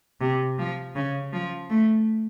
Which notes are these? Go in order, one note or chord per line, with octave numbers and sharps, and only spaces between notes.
C3
F3
C#3
F3
A3